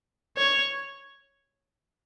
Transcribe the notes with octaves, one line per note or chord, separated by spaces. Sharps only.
C#5